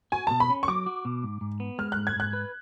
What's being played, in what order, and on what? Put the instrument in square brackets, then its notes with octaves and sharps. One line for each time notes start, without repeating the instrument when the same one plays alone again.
[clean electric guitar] F#4 [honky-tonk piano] G#5
[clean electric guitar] B2 [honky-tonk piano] A5
[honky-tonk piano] B5
[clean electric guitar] C#4
[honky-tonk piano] C#6
[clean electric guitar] F#3 [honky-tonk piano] D6
[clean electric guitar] F#4
B2
G#2
G#2
B3
[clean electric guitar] G#3 [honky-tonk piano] F6
[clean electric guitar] G#2 [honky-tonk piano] F#6
[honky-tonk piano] G#6
[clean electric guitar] G#2 [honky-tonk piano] F#6
[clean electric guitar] B4